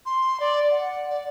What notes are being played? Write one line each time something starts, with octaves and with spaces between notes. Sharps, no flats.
C6
D5
F#5
D5